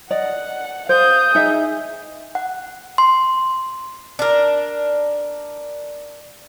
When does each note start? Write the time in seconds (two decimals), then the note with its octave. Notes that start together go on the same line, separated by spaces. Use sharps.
0.11 D5 D#5 F#5
0.89 C5 F5 D#6 G6
1.35 D#4 G#4 E5
2.35 F#5
2.98 C6
4.19 D4 A#4